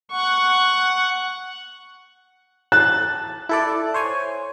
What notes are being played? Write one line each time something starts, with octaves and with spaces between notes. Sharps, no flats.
F#5 C#6
A5 F#6 A6
E4 A4 D5
C5 C#5 G#5